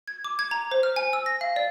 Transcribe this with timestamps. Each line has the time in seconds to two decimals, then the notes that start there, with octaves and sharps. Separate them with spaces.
0.08 G#6
0.24 D6
0.39 G#6
0.51 A#5
0.71 C5
0.83 F6
0.96 G#5
1.13 E6
1.26 A#6
1.41 F5
1.56 D5